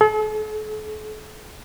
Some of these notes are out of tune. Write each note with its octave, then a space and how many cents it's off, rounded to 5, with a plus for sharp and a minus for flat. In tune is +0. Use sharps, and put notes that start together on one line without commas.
A4 -45